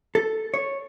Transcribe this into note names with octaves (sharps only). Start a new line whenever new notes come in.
A4
C#5